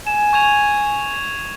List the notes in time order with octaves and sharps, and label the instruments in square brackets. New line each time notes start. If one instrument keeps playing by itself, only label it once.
[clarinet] G#5 [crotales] E7
[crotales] C#6 G#6 F7